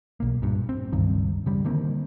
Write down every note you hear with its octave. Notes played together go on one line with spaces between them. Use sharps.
B1 A#3
G2 A#2
C4
F#1 C#2 G2 D#3
C#3 G3
D3 D#3 A#3 C4